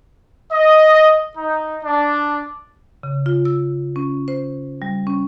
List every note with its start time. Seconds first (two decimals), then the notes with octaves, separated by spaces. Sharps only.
0.52 D#5
1.36 D#4
1.84 D4
3.03 C#3
3.26 F4
3.45 E6
3.96 C#4
4.28 C5
4.82 G3
5.07 C#4